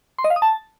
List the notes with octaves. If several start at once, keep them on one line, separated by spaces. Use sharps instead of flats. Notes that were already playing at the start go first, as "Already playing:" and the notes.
C6
D#5
F5
D#6
A5